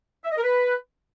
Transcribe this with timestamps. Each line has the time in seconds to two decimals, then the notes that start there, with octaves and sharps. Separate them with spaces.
0.24 E5
0.31 D#5
0.37 A#4
0.43 B4